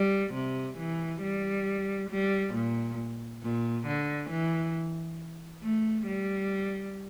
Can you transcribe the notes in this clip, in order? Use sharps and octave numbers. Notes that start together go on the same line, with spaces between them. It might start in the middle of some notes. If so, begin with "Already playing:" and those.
Already playing: G3
C3
E3
G3
G3
A#2
A#2
D3
E3
A3
G3